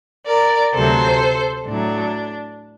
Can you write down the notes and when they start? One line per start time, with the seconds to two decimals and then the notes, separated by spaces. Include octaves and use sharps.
0.27 A#4 D5
0.74 D2 C3 F#3 A4 C5
1.66 A2 F#3 D4